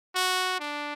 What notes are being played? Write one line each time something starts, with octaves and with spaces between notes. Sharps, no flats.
F#4
D4